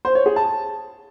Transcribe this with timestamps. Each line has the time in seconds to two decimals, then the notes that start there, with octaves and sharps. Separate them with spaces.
0.05 C5
0.15 C#5
0.26 G#4
0.36 A5